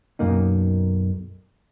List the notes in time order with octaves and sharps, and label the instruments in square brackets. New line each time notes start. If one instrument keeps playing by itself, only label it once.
[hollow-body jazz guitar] B1 F#2 A#3 D#4